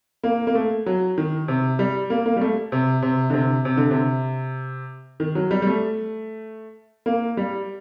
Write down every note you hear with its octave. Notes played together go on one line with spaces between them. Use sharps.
A#3
A#3
A3
F#3
D#3
C3
G3
A#3
A#3
G3
A3
C3
C3
D3
C3
C3
D3
C3
D#3
F#3
G3
G3
A3
A#3
G3